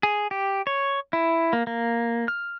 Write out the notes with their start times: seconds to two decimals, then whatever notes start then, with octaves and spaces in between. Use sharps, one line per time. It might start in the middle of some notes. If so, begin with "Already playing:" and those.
0.03 G#4
0.31 G4
0.67 C#5
1.13 E4
1.53 A#3
1.67 A#3
2.28 F6